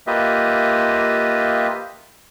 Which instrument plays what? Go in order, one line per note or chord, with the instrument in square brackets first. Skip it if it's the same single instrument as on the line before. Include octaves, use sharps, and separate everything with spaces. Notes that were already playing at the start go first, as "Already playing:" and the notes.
[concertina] A#3 F4 G4 B4 D#5 E5